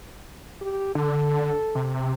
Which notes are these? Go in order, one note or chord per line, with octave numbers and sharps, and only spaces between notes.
G4
D3 A4
C3